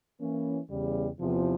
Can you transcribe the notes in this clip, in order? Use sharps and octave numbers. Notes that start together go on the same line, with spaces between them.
E3 A#3 C#4
E2 C#3 G3
E2 C3 F3